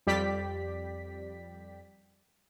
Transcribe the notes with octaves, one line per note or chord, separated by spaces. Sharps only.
F2 G3 G4 D5 B6